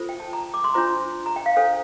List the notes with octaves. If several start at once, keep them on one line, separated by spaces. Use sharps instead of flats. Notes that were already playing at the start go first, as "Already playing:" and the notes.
Already playing: F4 A4 C5
G5
A5
A#5
D6
C6
D4 F4 C5 A#5
A#5
G5
F5
D4 A4 C5 F5